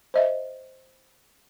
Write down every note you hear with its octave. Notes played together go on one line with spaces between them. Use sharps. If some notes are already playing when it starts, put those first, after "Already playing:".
C5 D#5 E5